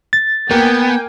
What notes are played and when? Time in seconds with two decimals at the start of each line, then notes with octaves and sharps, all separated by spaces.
0.13 A6
0.51 A#3 B3 G5 G#5